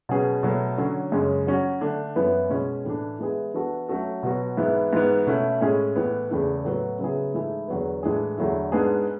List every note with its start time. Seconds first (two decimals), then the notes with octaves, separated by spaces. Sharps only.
0.09 B2 F#3 C#4 G#4 B4
0.43 B2 F#3 A3
0.78 D3 F#3 C#4
1.12 F#2 C#3 G#3 C#4
1.47 F#3 C#4 F#4
1.81 D3 A3 D4
2.16 F#2 E3 B3 E4 B4
2.50 B2 G#3 C#4
2.85 A2 E3 A3 D4
3.19 E3 G#3 B3 E4 G#4
3.54 E3 B3 D4 F#4 A4
3.89 F#3 A3 C#4 F#4 A4
4.23 B2 F#3 B3 F#4
4.57 G#2 E3 B3 E4
4.93 G#2 E3 B3
5.27 B2 A3 C#4 E4
5.61 A2 G#3 C#4 G#4
5.96 A2 E3 B3
6.30 E2 C#3 E3 A3
6.65 A2 F#3 B3 F#4
6.99 C#3 F#3 B3 E4 G#4
7.34 G#2 E3 A3 E4 G#4
7.68 E2 D3 F#3 B3
8.03 A2 E3 G#3 D4 G#4
8.38 E2 D3 F#3 A3 E4
8.72 G#2 G#3 B3 D4 G#4